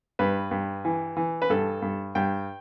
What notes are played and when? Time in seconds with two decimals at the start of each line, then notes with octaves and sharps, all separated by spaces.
0.19 G2 B4
0.51 G2
0.85 E3
1.17 E3
1.42 B4
1.50 G2 A4
1.82 G2
2.15 G2 G5